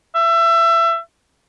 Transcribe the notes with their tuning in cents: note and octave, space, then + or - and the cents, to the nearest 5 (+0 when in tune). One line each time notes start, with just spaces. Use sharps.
E5 +25